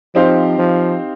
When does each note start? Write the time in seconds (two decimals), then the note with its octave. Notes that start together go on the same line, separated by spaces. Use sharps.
0.15 F3 C4 D#4 G4 C5 F5
0.59 F3